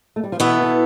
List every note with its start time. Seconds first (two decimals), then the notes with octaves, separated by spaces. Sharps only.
0.16 A3
0.24 G3
0.32 F3
0.40 B2 E3 B3 E4 A4
0.62 E3